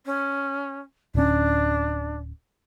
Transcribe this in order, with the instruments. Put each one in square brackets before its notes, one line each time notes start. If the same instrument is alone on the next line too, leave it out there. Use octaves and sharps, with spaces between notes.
[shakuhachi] C#4
[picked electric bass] D1 C#4 [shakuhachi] D4